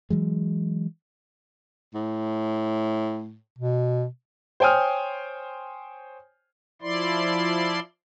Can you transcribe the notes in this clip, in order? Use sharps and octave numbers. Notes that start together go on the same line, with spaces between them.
E3 F#3 G#3
A2
B2
C5 C#5 G5 G#5 D#6 F6
F3 E4 D5 C6